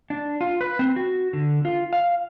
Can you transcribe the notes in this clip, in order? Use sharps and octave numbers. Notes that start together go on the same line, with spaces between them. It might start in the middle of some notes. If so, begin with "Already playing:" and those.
D4
F4
B4
C4
F#4
D3
F4
F5